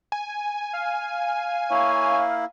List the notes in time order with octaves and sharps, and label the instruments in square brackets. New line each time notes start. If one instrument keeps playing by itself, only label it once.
[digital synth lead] G#5
[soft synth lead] F5
[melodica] A#3 E4 [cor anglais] C#5